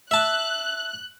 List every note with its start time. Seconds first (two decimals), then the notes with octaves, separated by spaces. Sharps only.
0.11 E5 A5 F#6